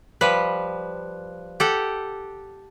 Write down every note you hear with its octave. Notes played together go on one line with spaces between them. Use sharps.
F3 G3 B4
G4 A4 F#5